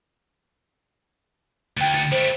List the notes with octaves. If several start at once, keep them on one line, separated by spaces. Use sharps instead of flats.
D2 G5 A6
A6 C#7
G3 A3 C5